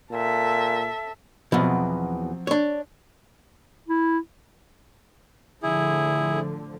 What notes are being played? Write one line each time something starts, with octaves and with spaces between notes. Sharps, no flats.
A#2 A4 E5
E2 B2 F3 F#3 C4
D4 C#5
E4
A2 D3 F3 E4 G#4